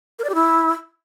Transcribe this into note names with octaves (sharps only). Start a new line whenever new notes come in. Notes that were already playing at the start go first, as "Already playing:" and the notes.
A#4
D5
G4
E4